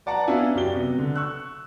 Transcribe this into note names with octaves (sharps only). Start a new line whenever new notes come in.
B4 D5 F#5 A5 A#5
B3 C#4 D4 E4 F5 G#5
F#2 F#4 G4 D5 G7
C3 B3 F#4
D3
C#6 E6 F#6